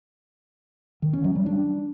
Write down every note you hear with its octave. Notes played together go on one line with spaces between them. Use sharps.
D#3
C#4
F#3
G3
D4